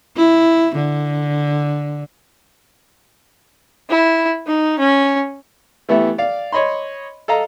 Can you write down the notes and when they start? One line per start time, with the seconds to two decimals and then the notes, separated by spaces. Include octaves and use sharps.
0.17 E4
0.76 D3
3.90 E4
4.46 D#4
4.79 C#4
5.89 E3 A3 B3 E4 G4 E5
6.18 D5 F5
6.53 C#5 D#5 B5 C6
7.28 A4 D#5 F5 A#5